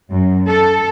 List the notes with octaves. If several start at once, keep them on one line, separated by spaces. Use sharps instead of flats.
F#2
A4